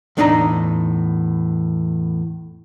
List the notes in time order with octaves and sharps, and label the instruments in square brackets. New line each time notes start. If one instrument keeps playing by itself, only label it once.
[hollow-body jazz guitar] E2 A2 D4 D#4 D5 A#5